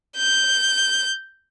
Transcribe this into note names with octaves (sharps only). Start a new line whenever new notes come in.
G6